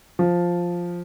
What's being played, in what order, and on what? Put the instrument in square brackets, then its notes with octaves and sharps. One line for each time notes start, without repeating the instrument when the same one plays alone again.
[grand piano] F3